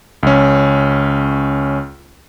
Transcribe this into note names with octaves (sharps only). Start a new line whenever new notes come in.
C#2 C#4